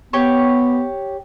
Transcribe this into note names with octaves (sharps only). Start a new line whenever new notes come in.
B3 G4 C#5